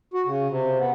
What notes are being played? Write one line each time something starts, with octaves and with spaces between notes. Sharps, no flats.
F#4
C#3
C3
B3